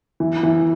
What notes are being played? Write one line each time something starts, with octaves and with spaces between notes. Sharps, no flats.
E3
E3